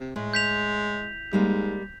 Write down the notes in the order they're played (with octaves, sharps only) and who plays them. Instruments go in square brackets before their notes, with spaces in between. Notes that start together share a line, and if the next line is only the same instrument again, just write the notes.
[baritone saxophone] C3
[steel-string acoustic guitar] A2 [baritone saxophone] G#3
[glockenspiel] G6 B6 F7
[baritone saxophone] G#2 [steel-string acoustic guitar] G3 G#3 A#3